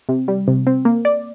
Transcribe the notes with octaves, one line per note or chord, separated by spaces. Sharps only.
C3
G3
C3
C4
A#3
D5